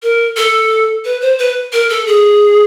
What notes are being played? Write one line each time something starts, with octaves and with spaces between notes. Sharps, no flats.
A#4
A4
B4
C5
B4
A#4
A4
G#4